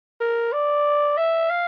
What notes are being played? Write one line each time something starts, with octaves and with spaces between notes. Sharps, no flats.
A#4
D5
E5
F5